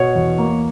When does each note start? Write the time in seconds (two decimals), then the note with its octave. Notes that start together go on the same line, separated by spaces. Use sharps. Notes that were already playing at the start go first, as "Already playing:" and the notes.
Already playing: B2 C#5
0.15 E2
0.38 A#3